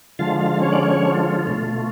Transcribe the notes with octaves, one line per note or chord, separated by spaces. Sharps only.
D3 F3 G#3 F4 F5
F4 F5
C#4 C#5
D5
C#4 C#5
F4
B2 A3 F4